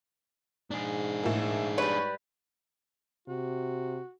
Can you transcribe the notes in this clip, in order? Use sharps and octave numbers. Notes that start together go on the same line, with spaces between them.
G#2 D4 G#4
A2 A#3
G3 B4 C#5
C3 F#4